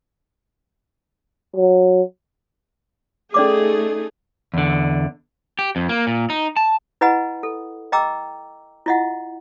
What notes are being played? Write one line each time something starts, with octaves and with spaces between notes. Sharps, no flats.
F#3
A3 C#4 D#4 G#4 D5 D6
E2 D3
G4
F2
A#3
A#2
D#4
A5
E4 B4 D#5 F#5 G#5 B5
A4
D#5 G5 A#5 D6 E6
E4 F4 D#5 E5 F#5